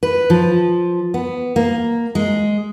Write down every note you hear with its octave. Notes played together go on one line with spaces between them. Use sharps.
B4
F3
B3
A#3
G#3